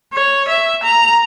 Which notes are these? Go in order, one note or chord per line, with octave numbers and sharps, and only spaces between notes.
C#5
E5
A#5